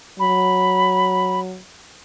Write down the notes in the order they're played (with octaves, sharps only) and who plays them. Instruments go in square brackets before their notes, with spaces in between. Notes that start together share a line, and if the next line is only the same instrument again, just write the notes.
[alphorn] F#3 [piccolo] B5